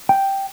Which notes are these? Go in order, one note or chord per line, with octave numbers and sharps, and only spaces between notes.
G5